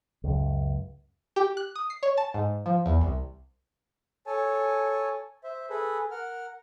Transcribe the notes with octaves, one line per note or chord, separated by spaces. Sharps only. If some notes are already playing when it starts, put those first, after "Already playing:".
C#2 F#2
G4
F#6
D#6
C7
C#5
A5
G#2
F3
E2
C2
A4 C#5 G#5 A5
C5 E5
G#4 A4 B4
A#4 F#5 F6